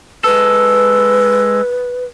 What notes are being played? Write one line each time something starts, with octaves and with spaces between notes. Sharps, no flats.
G#3 A4 B4